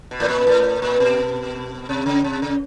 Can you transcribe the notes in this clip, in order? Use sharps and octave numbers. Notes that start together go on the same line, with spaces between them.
B2
A2
A#2
A2
A#2
B2
C3
C#3
C3
C#3